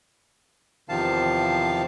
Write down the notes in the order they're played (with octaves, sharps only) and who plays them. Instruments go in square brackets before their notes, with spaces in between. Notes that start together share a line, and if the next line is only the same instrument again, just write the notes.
[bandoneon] E2 C3 D#3 F3 F5 A5